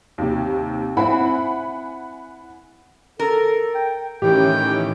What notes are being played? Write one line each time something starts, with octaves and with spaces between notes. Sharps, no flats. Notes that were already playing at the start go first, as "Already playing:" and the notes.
D#2 C3
C4 E4 F#5 G#5 B5
A4 A#4
G5
A2 D#3 E3 C#4 G4 G5